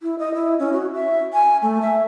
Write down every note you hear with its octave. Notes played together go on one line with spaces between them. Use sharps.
E4
D#5
E4
C#4
F#4
E5
G#5
A3
E5